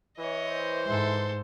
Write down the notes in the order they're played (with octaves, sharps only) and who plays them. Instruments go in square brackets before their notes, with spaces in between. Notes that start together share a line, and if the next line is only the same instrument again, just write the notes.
[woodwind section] E3 [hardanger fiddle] C#5 D#5
[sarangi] C5
[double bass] G#2 [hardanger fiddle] A4 C6